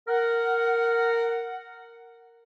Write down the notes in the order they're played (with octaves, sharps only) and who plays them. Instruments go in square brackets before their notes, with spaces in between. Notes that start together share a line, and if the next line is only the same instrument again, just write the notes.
[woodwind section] A#4 F#5